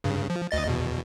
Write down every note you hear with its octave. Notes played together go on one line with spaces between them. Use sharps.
G2 C#3
F3
D2 D#5 A6
E2 B2